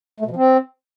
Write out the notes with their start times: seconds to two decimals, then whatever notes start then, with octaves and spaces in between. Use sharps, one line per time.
0.20 A3
0.26 B2
0.31 F3
0.36 C4